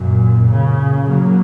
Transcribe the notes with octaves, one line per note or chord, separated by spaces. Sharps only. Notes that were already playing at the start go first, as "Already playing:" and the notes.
Already playing: F#2 A#2
A#2 C#3
F#3 A#3